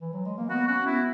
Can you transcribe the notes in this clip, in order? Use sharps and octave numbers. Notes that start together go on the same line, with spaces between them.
E3
F#3
G#3
A#3
B3 F#4
C#4 F#4
B3 E4